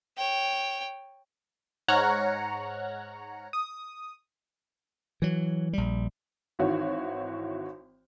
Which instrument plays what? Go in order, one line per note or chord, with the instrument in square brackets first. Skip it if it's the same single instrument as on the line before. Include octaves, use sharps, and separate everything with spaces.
[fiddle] C#5 G5
[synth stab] G#2 C#5 F#5 A#5 F6 F#6
D#6
[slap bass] E3 F#3
A#1 G3
[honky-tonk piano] G#1 D#3 E3 F#4 C#5